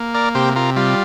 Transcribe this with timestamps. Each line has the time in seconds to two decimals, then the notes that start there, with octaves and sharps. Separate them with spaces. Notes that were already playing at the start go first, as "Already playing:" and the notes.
Already playing: A#3
0.14 A#4 D5
0.35 C3 G4 C5
0.56 F4 A#4
0.76 G3 F4